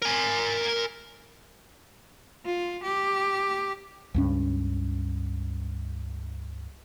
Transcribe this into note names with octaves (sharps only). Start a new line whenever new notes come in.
A#4 G#5
F4
G4
C#2 G2 C#4